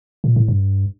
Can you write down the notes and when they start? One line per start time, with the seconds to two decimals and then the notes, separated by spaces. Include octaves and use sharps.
0.24 A#2
0.36 A2
0.48 G2